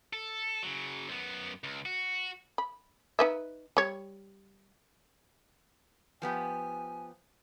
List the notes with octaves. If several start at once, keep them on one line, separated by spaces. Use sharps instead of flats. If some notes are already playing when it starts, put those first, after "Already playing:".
A4
C#3 F#3
F#2 B3
C#2
F#4
B5
D#4 B4 E5
G3 C#5
F3 B3 G4 G#5